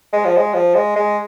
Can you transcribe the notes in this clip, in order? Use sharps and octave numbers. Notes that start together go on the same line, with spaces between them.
G#3
F3
G#3
F3
G#3
G#3